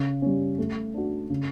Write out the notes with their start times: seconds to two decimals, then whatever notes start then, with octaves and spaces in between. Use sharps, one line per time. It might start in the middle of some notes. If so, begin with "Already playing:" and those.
Already playing: C#3
0.22 G3 C#4
0.58 A3
0.94 D4 F#4
1.30 C#3